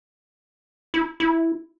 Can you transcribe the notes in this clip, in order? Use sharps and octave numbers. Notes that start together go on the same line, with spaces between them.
E4
E4